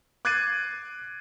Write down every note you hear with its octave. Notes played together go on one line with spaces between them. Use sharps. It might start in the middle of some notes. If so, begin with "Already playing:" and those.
D6 F#6 G#6 A6 C7 D#7